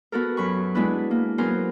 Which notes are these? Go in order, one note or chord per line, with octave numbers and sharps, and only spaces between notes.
B3 F#4 A4 A#4
F#2 F#3 B5 C#6
G#3 B3 D4 E4 B4
A#3
F#3 B3 C#4 G#4 A#4 C5